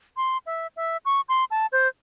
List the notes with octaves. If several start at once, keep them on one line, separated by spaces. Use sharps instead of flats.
C6
E5
E5
C#6
C6
A5
C5